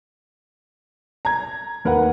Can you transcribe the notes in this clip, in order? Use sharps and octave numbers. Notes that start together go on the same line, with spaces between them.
A#5 G#6
D#2 A#4 B4 F#5